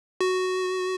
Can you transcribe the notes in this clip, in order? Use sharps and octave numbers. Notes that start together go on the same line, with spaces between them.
F#4